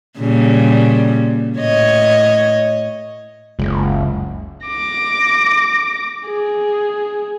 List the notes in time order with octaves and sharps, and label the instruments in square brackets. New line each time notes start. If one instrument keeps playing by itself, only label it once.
[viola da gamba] A#2 C#3 G3
A2 C#5 D#5
[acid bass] F#1 [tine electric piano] C#2
[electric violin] D6 A#6
G#4